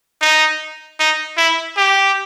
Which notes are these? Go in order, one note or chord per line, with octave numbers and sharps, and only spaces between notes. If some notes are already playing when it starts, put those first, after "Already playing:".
D#4
D#4
E4
G4